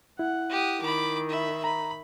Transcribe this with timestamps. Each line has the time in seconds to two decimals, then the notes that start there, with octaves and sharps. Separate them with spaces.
0.19 E4 F#5
0.50 G4 D#6
0.82 D#3 B5 D6
1.29 E5 B5
1.64 A#5 B5